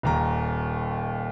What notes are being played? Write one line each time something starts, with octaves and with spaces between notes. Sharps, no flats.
D#1 D#2 A#5